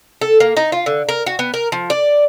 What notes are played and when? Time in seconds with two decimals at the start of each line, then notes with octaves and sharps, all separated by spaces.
0.21 A4
0.40 A#3
0.57 D#4
0.72 F4
0.86 D3
1.09 A#4
1.27 F#4
1.39 B3
1.54 A#4
1.72 F3
1.90 D5